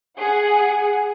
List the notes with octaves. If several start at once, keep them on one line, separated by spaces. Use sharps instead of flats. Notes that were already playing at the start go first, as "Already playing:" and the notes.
G#4 F#5